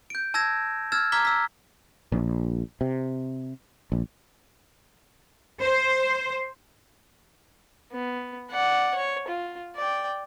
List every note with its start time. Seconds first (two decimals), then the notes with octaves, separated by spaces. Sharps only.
0.10 G6 D7
0.34 A5 E6 G#6 A#6 E7
0.92 E6 F6 G#6 A6 E7
1.12 A#5 D6 F6 G#6 B6 G7
1.25 E6 B6
2.12 A#1
2.81 C3
3.92 A#1
5.61 C5
7.92 B3
8.51 D5 F#5
8.95 C#5
9.28 F4
9.76 D5 G5